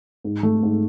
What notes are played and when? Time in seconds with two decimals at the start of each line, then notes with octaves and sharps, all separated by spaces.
0.24 G#2
0.43 A3
0.63 G#2